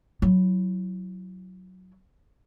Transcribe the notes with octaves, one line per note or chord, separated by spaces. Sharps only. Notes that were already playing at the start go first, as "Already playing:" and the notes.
F#3 E4